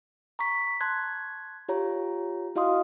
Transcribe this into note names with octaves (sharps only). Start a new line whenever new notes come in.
A#5 C#6 B6
A5 C6 F#6 G#6
F4 G4 C#5 A#5
E4 F#4 D#5 F5 C6 D#6